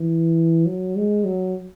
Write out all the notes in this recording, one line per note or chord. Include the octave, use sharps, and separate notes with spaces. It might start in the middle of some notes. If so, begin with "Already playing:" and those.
Already playing: E3
F#3
G#3
F#3